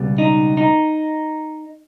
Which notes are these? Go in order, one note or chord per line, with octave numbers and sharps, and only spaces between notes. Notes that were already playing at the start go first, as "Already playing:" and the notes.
Already playing: C#2 B2 G3 B3
D#4
D#4